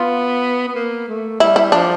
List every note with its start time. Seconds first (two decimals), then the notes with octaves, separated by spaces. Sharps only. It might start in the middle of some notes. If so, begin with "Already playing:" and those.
Already playing: B3 F4
0.68 B3
0.75 A#3
1.08 A3
1.40 G3 E4
1.56 E4
1.72 F3 D4